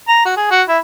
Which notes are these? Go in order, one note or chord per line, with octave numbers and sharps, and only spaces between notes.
A#5
F#4
G#4
F#4
E4